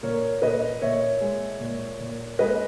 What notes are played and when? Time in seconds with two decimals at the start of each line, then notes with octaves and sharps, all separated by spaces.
0.03 A#2 A#4 C#5
0.42 A#2 B4 D#5
0.82 A#2 C#5 E5
1.21 G#3
1.60 A#2
1.99 A#2
2.39 G#3 B4 D#5